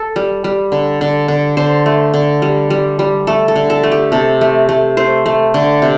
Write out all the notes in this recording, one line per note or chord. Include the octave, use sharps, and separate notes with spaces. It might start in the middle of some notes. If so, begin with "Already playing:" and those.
Already playing: A4
G3
G3
D3
D3
D3
D3 C5
A3
D3
G3
G3
G3
A3 A4
A4
D3
A4
A3
G4
C3 A4
A3
A3
A3 C5
A3
D3
C3